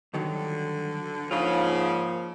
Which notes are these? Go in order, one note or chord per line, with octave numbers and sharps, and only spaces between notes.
G2 D3 D#3 F#3
G#2 C#3 F3 A#3 F4